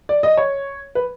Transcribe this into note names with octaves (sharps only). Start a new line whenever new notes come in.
D5
D#5
C#5
B4